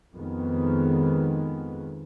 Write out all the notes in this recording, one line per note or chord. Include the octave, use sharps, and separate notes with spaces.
F2 D#3 G#3 B3